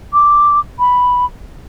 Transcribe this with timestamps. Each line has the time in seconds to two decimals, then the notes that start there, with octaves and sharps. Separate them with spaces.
0.13 D6
0.79 B5